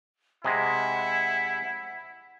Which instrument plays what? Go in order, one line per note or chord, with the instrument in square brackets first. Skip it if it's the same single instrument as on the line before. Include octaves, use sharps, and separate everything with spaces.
[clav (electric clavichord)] C3 G#3 [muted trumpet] E4 [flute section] E5 F#5 G#5